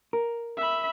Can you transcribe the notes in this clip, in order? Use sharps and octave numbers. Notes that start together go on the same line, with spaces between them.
A#4
E5 B5